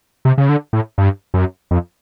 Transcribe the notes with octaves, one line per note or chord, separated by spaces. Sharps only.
C3
C#3
D3
A2
G2
F#2
F2